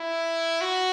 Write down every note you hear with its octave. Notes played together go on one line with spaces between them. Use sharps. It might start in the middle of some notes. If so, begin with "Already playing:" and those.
Already playing: E4
F#4